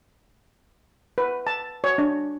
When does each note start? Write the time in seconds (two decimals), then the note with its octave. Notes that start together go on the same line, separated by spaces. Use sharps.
1.18 B4
1.47 A5
1.84 C#5
1.98 D4